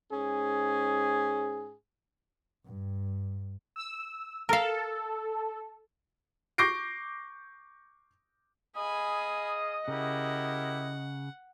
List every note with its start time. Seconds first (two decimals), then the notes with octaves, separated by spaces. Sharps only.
0.13 G#2 C#4 G#4
2.65 G2
3.76 E6
4.49 A4 A#4 F5
6.58 C#6 D6 G6 A#6 C7 D7
8.76 G#4 D#5 F5 G#5 B5 D#6
9.88 C#3 E4 G4 A#4 F#5